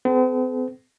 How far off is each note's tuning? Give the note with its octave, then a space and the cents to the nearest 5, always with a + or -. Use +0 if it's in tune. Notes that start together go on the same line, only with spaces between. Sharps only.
C4 -45 A4 -45